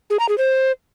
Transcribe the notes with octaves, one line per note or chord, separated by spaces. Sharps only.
G#4
A#5
G#4
C5